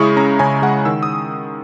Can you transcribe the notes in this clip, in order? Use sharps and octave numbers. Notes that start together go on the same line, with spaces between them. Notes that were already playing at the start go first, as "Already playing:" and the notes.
Already playing: C#3 G#3 E4 C#6 D#6
C#4 A#5
C#3 G#5
G#3 F#5
D#3 E6
D#6